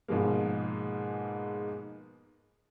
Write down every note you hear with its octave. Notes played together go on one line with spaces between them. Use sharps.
G#2 B2 F3 G#3 A#3